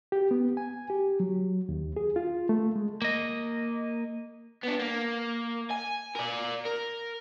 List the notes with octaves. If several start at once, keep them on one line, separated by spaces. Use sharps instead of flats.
G4
B3
G#5
G4
F#3
D#2
G#4
F4
A3
G#3
A#3 D#5
B3 D4
A#3
G#5
A#4 D5
A#4